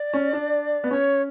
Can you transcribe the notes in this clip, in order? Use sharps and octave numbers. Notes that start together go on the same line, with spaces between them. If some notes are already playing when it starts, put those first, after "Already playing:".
Already playing: D5
C#4
D4
B3
C#4 C#5